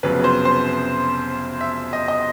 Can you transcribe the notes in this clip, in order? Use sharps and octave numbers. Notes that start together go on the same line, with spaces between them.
F1 F2 C#3 F#3 B3 B4
C5
C5
E5
D#5
D#5